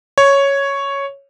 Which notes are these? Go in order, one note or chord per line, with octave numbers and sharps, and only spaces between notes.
C#5